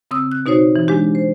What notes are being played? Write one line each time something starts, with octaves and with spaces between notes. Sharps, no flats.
C#3 C4 D#6 E6
F#6
B2 D#4 F#4 C5 C#5
E3
G#3 D4 G4
C5